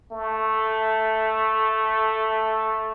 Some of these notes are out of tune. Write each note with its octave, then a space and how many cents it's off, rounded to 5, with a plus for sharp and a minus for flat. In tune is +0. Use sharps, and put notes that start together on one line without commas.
A3 +0